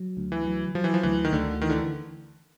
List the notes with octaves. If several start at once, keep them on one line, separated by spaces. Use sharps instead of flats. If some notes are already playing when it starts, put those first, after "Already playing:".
Already playing: F#3
D2
E3
F#3
F3 F#3
E3
F3
D2 E3
D#3
D2 D3
D#3 E3
D3